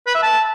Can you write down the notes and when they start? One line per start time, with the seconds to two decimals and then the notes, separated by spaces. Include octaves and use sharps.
0.06 B4
0.14 E5
0.22 A5